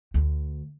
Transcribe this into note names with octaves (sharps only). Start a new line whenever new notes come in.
D2